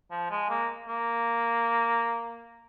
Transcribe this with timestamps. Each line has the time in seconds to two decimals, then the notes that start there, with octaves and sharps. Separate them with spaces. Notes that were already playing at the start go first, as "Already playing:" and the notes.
0.11 F3
0.30 G#3
0.50 A#3
0.88 A#3